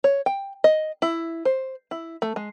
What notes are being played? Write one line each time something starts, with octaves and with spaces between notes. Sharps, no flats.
C#5
G5
D#5
E4
C5
E4
A3
G#3